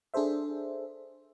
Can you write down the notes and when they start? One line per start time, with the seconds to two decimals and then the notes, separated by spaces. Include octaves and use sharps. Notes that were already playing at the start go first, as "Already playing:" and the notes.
0.14 D4 G#4 A4 C5 E5